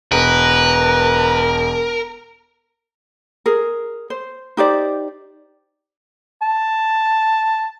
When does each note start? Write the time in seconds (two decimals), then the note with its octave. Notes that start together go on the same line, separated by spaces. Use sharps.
0.12 E1 A#4 B4 A#5
3.46 G#4 A#4
4.10 C5
4.57 D#4 G4 C5 D5
6.42 A5